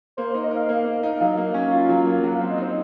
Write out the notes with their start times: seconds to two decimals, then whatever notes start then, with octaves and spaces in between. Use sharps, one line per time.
0.17 A#3 C5
0.30 C5
0.34 D#4
0.43 D#5
0.51 A#4 F5
0.69 A#3
0.85 A#3
1.03 D#4
1.20 F#3 F5
1.37 A#3
1.54 C#4
1.71 F4
1.89 F#3
2.05 A#3
2.24 F#3 F#5
2.35 F5
2.41 C4
2.49 D#5
2.57 D#4 C5